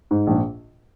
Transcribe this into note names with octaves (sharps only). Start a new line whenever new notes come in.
G#2
A#1